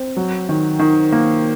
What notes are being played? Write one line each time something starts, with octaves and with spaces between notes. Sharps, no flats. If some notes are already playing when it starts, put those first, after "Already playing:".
Already playing: C4
F#3
D#3
D#3
A#3